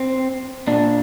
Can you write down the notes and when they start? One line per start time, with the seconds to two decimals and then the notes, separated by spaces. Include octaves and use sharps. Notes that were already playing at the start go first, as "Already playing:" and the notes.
Already playing: C4
0.67 A#2 D4